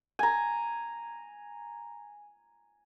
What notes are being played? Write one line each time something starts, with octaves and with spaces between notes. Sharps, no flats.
G#5 A#5